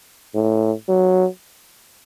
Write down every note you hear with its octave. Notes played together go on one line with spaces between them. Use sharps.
A2
F#3